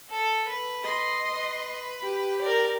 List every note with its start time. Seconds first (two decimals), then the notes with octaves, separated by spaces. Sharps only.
0.10 A4
0.48 B4
0.82 D#5 C6
1.32 B4
2.03 G4
2.42 A#4 D5